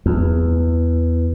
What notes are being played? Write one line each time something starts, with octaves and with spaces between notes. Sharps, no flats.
E2